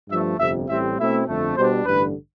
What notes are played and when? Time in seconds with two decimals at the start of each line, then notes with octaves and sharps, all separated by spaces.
0.10 G2 F3 A3 E5
0.39 G1 F2 C3 E5
0.69 A1 A2 G3 C4 E5
0.98 B2 A3 C4 E4 E5
1.27 G1 F2 D3 A3
1.56 B2 G3 D4 C5
1.85 A1 G2 D3 B4